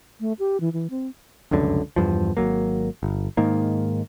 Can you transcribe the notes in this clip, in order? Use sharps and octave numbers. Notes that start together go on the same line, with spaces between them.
A3
G4
E3
E3
C4
F1 C#2 F#2 D3
E2 G2 F3
G#1 E2 F#3 A#3
G1
G#2 D#3 A#3